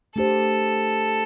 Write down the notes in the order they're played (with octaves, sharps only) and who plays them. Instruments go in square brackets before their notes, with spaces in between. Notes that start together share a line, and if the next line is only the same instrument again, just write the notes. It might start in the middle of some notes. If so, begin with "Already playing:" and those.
[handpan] A3 D4 G4 C5 [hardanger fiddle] A4